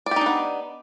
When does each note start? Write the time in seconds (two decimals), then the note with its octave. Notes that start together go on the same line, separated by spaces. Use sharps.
0.06 D5
0.11 G4
0.16 D#4
0.21 D4
0.26 B3